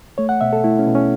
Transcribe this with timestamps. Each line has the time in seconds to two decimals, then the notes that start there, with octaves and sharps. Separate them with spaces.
0.18 A3 C#5
0.29 F#5
0.41 B2 E5
0.53 A4
0.64 A3 E4
0.79 C#4
0.87 B2
0.95 C#4